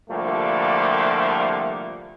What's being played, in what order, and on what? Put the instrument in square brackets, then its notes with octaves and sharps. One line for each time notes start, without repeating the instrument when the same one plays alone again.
[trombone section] C2 D3 F3 G3 A3 A#3